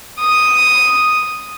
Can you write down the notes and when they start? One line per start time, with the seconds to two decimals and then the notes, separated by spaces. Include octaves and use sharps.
0.20 D#6